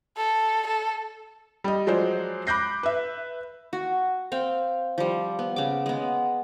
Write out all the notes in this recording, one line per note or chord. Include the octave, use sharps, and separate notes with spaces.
A4
A4
G3 D#5
F3 F#3 G#3 C5 D5
B5 D6 F#6 G6 A#6 C7
B4 E5
F#4
C4 F5 G5
F3 G3
B3
C#3 D6
G#3 B3